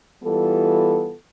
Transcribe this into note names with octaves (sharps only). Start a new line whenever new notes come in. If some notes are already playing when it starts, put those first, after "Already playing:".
E3 G3 B3 F4 A4